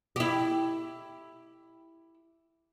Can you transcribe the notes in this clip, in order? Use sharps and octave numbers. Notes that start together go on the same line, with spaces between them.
E4 G4